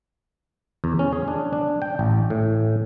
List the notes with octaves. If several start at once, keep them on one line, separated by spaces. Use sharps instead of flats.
E2
C#4
G#4
D4
D4
G5
A1
A2